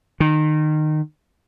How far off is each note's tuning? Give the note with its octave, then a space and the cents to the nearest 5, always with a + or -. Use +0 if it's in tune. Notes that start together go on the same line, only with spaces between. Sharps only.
D#3 -20